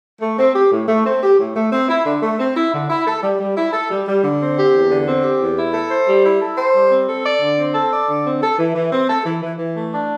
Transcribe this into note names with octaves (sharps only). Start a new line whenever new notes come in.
A3
C4
G4
A2
A3
C4
G4
A2
A3
C4
E4
D3
A3
C4
E4
D3
E4
A4
G3
G3
E4
A4
G3
G3
D3
C4
G4
E2
D3
C4
G4
E2
E4
A4
C5
G3
E4
A4
C5
G3
C4
A4
D5
D3
C4
A4
D5
D3
C4
A4
E3
E3
C4
A4
E3
E3
E3
A3
D4